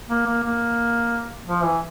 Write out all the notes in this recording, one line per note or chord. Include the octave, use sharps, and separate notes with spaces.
A#3
A#3
A#3
F3
E3